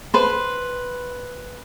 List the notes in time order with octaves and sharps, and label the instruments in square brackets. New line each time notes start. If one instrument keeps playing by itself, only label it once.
[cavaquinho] B4 C5